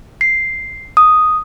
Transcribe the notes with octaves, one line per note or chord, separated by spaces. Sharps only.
C7
D#6